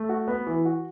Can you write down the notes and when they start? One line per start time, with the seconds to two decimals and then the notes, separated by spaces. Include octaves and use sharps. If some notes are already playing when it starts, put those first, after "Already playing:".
Already playing: A3
0.09 F#4
0.28 B3
0.47 E3
0.65 F#4